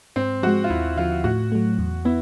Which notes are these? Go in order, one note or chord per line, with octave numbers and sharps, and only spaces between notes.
G#2 C4
F3 G#3 F#4
F4
D#2 E4
D3 F3 F4
A2 F#4
F#3 A3
E2
B3 E4